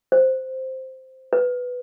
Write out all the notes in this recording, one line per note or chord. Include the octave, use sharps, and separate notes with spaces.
C5
B4